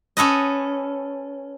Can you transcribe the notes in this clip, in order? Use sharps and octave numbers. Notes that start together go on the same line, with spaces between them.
C#4 A4 B4 D#5